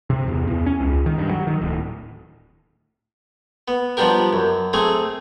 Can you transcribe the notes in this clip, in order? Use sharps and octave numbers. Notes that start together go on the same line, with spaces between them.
C3
E2
E2
C#4
C#2
D#3
G2
F#3
D#3
D1
B3
F3 G3 B3 D4 G4 A#4
F#2
A3 C4 G#4 A#5